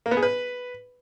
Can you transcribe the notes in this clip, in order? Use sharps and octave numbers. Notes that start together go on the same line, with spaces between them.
A#3
B3
G#4
B4